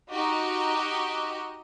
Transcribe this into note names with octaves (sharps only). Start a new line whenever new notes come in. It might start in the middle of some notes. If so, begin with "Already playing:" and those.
D#4 F#4 G4 D#5